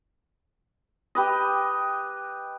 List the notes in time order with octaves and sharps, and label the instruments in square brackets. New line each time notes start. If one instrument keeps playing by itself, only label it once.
[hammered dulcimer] G4 B4 D#5